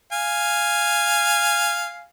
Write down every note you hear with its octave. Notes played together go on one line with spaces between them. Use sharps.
F5 G#5